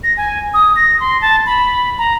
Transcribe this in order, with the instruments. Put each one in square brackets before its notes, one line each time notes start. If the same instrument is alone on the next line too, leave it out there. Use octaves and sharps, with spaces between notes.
[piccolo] A#6
G#5
D#6
A#6
C6
A5
B5
A#5